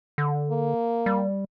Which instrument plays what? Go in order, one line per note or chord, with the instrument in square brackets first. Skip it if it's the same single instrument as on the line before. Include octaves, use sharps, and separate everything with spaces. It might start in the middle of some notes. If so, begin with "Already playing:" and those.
[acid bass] D3
[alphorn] A#3
[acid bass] G3